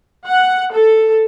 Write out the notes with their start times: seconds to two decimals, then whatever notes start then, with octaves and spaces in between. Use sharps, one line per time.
0.25 F#5
0.73 A4